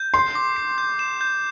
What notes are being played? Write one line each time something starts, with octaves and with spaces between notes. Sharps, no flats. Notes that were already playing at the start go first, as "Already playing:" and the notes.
Already playing: G6
C6 C7
D6
C7
G6
E7
G6